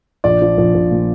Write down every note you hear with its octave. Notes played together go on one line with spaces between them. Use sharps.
A#1 D5
F3
A#1
A#1
A#2